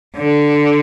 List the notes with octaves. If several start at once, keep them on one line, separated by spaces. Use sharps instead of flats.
D3